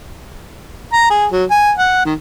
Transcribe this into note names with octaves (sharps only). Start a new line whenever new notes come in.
A#5
G#4
F#3
G#5
F#5
D#3